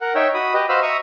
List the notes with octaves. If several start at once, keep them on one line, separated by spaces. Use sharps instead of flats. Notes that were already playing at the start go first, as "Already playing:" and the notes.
A#4 F#5
D#4 C#5 E5 G5
F#4 B5 D#6
G4 B4 D#5
F#4 C5 D#5 F5 B5 E6
E5 A#5 C#6 D#6